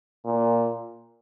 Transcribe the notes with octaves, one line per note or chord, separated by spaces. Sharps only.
A#2